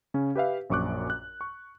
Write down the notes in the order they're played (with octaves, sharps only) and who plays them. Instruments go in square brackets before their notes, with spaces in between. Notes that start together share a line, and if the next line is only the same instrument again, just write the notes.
[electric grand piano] C#3 C#4
G4 B4 E5 F5
A#1 F#2 C#6 D6 F#6
F#6
C#6